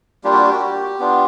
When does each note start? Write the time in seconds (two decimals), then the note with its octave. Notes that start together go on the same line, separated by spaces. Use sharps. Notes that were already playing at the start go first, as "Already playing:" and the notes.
0.24 G3 A#3 D4 F4 G4
0.33 F#4
0.42 G4
0.52 F#4
0.61 G4
0.99 B3 D4 F4